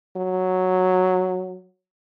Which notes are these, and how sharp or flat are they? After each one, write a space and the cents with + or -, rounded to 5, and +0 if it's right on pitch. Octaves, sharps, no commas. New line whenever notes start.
F#3 -5